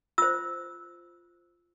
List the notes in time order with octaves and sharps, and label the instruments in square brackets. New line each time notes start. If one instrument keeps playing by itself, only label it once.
[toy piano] F4 C5 E6